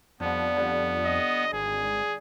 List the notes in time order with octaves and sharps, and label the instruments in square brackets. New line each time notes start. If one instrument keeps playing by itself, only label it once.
[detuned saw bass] F2 [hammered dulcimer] D3 F3 G3 [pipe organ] B3
[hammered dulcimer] D3 G3
[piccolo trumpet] D#5
[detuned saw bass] G#1 [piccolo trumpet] G#4